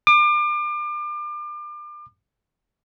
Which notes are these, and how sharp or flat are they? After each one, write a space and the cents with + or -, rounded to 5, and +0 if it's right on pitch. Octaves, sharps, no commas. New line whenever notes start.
D6 +35